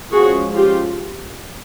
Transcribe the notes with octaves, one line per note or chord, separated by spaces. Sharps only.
F3 G#3 C#4 F#4 G#4
F4 G4